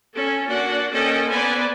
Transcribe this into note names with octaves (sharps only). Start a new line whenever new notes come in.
C#4 A4
A#3 D4 F#4 F#5
A#3 C#4 A4 D#5 G5
B3 B4 C5 D5 G#5